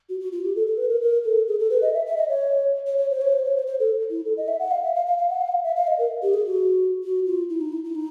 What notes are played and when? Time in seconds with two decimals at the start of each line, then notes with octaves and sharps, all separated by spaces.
0.09 F#4
0.20 F#4
0.32 F4
0.44 G4
0.56 A4
0.67 A4
0.77 B4
0.89 A#4
1.01 A#4
1.24 A4
1.47 G#4
1.59 A4
1.70 B4
1.82 D#5
1.94 E5
2.06 E5
2.17 D#5
2.28 C#5
2.86 C#5
2.98 C#5
3.10 C5
3.21 C#5
3.32 C5
3.44 C#5
3.56 C5
3.67 C5
3.79 A4
4.10 E4
4.25 A4
4.37 D#5
4.48 E5
4.59 F#5
4.71 F5
4.83 E5
4.95 F5
5.06 F5
5.18 F5
5.30 F#5
5.41 F5
5.48 F#5
5.52 F5
5.63 E5
5.76 F5
5.87 D#5
5.98 A#4
6.22 G4
6.34 G#4
6.45 F#4
7.03 F#4
7.26 F4
7.49 E4
7.61 D#4
7.72 E4
7.84 E4
7.95 D#4